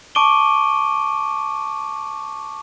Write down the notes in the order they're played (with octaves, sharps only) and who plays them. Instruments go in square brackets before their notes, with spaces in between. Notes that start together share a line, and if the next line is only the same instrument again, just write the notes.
[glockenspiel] A5 C#6 D6 D7 D#7 G7